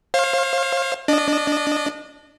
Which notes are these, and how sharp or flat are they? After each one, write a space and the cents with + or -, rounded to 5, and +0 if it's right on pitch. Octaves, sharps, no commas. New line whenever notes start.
C5 +40 F5 +0
D4 -15 D#5 -35